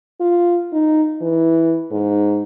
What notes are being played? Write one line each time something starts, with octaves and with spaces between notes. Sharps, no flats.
F4
D#4
E3
G#2